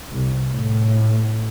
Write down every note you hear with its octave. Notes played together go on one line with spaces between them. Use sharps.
C2
A2